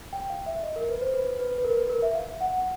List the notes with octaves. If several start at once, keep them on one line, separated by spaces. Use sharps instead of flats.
G5
F5
E5
D#5
A#4
B4
C5
B4
B4
B4
A#4
B4
A#4
E5
F5
F#5